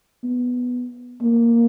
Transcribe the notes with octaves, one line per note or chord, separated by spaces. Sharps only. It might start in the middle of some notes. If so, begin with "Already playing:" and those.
B3
A#3